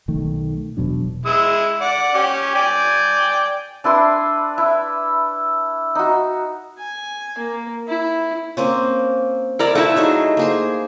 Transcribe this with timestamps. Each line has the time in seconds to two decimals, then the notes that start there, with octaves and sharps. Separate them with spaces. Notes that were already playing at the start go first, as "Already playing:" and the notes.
0.08 B1 D#3 A3
0.77 E1 B2 F#3 D4
1.26 G#3 E4 E6
1.81 D5 F#5
2.14 C#4 G4
2.55 D5 G5 G#5
3.84 D4 E4 B4 C6
4.58 E4
5.95 D#4 F#4
6.79 G#5
7.38 A#3
7.88 E4
8.57 A#3 C4 C#4
9.59 E4 A#4 D5
9.75 A3 E4 F4 F#5
9.96 F#3 D#4 G#4
10.37 A#3 G#4 C5